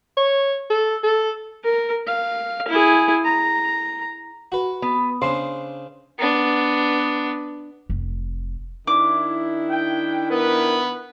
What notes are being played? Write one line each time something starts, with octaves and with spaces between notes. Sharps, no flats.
C#5
A4
A4
A#4
F5
E4 G#4
A#5
F#4 B4
B3
C#3 D4 C5
B3 D4
F1
D#3 D4 E4 D6
G5
B3 A#4 B4